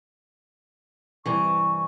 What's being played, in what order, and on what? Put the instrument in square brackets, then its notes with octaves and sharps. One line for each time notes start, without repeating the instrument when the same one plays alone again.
[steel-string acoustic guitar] G2 C3 E3 [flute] C#6